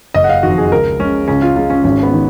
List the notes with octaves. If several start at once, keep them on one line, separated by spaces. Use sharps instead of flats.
F#1 D#5
F#5
F5
F2 D#3 F#4
G#4
C#2 A#4
C#3 G#3 C#4
C#2 C#4
F4
C#3 G#3 F4
C#4
G#1 C#4
B3
D#3